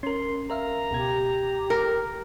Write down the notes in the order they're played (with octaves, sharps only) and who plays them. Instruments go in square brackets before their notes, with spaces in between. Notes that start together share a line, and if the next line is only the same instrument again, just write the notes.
[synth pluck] C#4 A#4 [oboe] C6
[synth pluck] A#4 E5 F5 [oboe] A#5
[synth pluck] C#2 B2 G#6 [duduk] G4
[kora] A#4